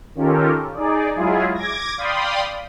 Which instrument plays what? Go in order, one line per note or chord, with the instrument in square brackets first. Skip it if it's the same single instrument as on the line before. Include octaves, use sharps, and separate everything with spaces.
[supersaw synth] D#3 C#4 F4 G4 A4 A#4
D#4 G#4 D5
F#3 G#3 E4 F4 G#4
D6 G#6 A#6
D5 F5 G5 B5 C6 D#6